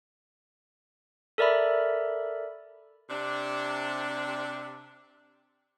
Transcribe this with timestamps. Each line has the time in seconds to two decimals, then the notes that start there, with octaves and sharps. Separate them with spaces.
1.38 A4 A#4 D5 E5 B5
3.10 C3 D4